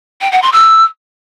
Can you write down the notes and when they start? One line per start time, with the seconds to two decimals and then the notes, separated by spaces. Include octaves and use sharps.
0.21 G5
0.32 F#5
0.42 C6
0.53 E6